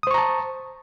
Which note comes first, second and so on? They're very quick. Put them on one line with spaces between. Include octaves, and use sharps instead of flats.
D#6 C5 C#6 A#5 A5